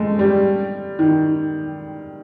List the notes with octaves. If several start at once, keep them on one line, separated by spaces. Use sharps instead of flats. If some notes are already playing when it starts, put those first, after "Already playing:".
Already playing: G#3 A3
G3
D#3